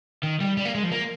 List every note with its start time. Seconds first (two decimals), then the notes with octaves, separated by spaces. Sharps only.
0.23 D#3
0.41 G3
0.57 G3
0.65 A#3
0.75 G#3
0.84 F3
0.92 A#3